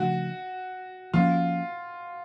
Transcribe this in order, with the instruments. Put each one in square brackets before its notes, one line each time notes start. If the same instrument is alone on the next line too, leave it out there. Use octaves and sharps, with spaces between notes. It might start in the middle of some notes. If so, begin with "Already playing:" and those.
Already playing: [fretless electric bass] C#3 F3 A3 D4 [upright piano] F#4
[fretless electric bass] F3 A#3 C#4 [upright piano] F4